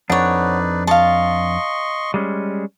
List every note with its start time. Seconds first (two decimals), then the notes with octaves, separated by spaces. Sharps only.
0.10 F2 D4 D#4 B4 C#5 D5 F#5
0.87 D#5 F5 A5 C6 C#6
2.14 G3 G#3 C#4